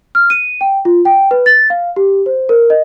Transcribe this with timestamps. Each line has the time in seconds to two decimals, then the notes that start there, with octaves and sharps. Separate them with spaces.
0.15 F6
0.30 D#7
0.61 G5
0.85 F4
1.05 G5
1.31 B4
1.46 A6
1.70 F5
1.96 G4
2.26 C5
2.49 A#4
2.70 D#5